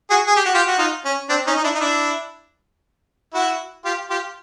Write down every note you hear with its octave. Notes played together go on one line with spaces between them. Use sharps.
F#4 G#4
G#4
G4
F#4
F4 G4
F#4
D#4 F4
C#4
C4 D4
C#4 D#4
D#4
D4 E4
D#4
D4 E4
E4 F#4
F4 G4
F4 G4